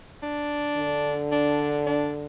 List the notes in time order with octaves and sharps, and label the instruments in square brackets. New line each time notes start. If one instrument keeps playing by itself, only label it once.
[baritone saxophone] D4
[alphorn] D3
[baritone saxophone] D4
D4